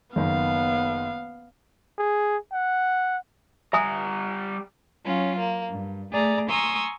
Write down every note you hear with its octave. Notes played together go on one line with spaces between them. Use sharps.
F#1 D#3 B3 F5
G#4
F#5
G3 E5 G#5 A#5 D#6
F#3 C#4 F4
A#3
G2
A3 G#4 D5 A#5
G#5 A#5 C6 C#6 D#6 E6